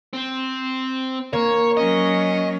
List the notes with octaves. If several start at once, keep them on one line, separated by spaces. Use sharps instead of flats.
C4
A#3 C#5
F#3 C#4 D#5